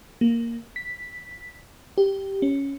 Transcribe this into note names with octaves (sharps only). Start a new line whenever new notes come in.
A#3
B6
G4
C#4